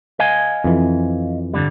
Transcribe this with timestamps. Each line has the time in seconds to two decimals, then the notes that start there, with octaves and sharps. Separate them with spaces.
0.20 D#5 F5 G#5
0.64 F2 E3
1.54 G2 D3 G3